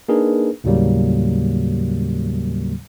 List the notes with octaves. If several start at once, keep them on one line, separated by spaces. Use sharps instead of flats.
A#3 D4 D#4 G#4 A#4 B4
D#2 A2 C#3 F#3 G3 A#3